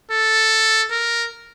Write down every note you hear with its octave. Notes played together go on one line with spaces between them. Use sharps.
A4
A#4